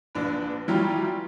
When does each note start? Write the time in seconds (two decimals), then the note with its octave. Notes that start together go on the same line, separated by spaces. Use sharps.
0.15 A#1 D4 B4
0.68 E3 F#3 G3 F4 G4